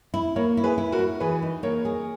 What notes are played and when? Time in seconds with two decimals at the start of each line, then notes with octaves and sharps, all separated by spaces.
0.14 E4
0.35 A#3 A#4 C#5
0.57 E4
0.64 G#4 B4
0.78 E4
0.92 F#4 A#4
0.99 E4
1.20 E3 G#4 B4
1.42 D#4
1.63 A#3 A#4 C#5
1.85 G#4